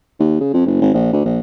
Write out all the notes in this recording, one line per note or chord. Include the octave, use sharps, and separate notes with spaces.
D#2
C#3
F2
F#1
G#1
A#1
D2
A#1